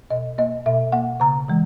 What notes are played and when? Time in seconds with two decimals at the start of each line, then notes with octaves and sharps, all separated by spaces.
0.10 B2 D#5
0.38 A#3 D#5
0.66 B2 E5
0.92 A#3 F#5
1.20 C#3 A#5
1.48 E3 G#3